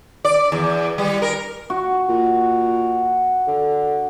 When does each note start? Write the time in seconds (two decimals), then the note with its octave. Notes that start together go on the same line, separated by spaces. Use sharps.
0.25 D5
0.52 E2
0.98 G3
1.22 A#4
1.70 F#4
2.09 A#2
3.47 D3